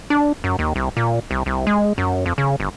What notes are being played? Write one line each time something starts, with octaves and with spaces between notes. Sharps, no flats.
D4
F#2
D#2
C2
A#2
C2
C2
G#3
F#2
F2
C#3
G1